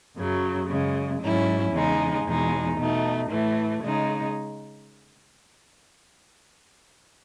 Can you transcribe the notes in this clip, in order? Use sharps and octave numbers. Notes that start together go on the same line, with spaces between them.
F#2 C#3 F#3
F#2 C#3 G#3
G#2 F#3 C#4 E4
E2 C#3 G#3 D#4
E2 B2 G#3 D#4
B2 A3 D#4
A2 E3 A3
C#3 G#3 D#4